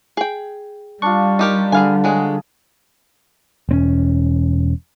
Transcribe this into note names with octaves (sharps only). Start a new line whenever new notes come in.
G#4 G5
G3 D4 F4 C#6
D#4 G4 A#4
D3 G#4 B4 F5 G#5 A#5
F#3 G#3 F#4 G#4 G#5
E1 C4 C#4